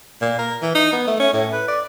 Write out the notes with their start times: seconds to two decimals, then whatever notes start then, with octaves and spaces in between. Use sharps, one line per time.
0.21 A#2
0.38 A#4
0.62 E3
0.75 D#4
0.92 B3
1.07 A3
1.19 C#4
1.33 A2
1.52 B4
1.68 D5